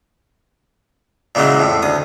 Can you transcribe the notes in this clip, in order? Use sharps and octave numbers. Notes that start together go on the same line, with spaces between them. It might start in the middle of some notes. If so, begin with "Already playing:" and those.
A#2 C#3 E3 F#3 G#3
F2 A2
D2 D#6